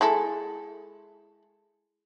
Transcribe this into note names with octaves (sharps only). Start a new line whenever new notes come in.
G#3 E4 A4